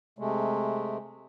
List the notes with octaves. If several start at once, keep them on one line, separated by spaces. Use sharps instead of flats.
C3 G#3 A3